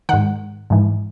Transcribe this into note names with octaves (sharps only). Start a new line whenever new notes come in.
G#2 D#3 F#5
G#2 E3